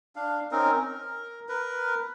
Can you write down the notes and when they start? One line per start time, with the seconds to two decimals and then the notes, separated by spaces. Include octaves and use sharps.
0.16 D4 F5
0.52 C4 C#4 D#4 A#4
0.74 A#4
1.49 A#4 B4